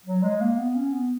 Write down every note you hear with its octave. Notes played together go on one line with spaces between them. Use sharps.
F#3
G#3
A#3
B3
C#4
B3